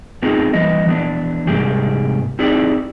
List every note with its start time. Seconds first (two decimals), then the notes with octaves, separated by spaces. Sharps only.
0.22 A3 B3 C4 D#4 F4 G#4
0.53 E3 G3 A#3 D#5
0.87 E3 B3 D4
1.47 G#2 C3 G3 A#3 G4 G#4
2.39 C4 D#4 E4 G4 G#4 D5